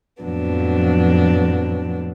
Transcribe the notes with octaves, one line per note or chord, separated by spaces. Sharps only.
F2 A2 F3 F#3 B3 D4